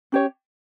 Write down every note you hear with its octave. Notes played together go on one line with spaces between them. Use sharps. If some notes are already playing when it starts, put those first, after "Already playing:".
C#4 G4 C#5